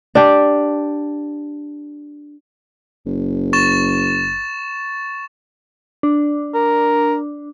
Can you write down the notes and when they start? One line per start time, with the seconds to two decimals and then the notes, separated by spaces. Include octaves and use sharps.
0.15 D4 G4
3.06 F#1
3.53 C#6 A6 E7
6.03 D4
6.55 A#4